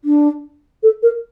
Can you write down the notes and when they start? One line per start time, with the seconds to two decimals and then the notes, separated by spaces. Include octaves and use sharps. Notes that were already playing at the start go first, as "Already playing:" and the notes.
0.05 D4
0.83 A4
1.03 A#4